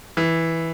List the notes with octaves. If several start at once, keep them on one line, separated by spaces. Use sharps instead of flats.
E3